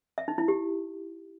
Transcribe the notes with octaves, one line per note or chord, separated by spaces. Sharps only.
E5
D#4
E4
G4